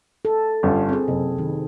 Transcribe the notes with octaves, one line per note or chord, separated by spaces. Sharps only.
A4
G1 C#4 F4
C4 G#4
F#1 C3
D#3